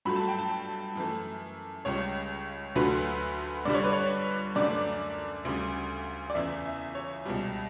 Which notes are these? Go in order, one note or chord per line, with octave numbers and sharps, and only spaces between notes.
G2 F#3 A3 B5
A5
G5
A5
F#2 E3 A3
C#2 C#3 G3 C#5
D2 D3 F#3 A3 B4
G2 D3 G3 D5
C#5
B4
C#5
F#2 D3 A3 D5
D2 C#3 G3
D5
E2 C#3 E3 E5
E5
C#5
C#2 B2 G3